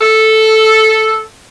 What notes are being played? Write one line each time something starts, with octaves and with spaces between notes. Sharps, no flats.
A4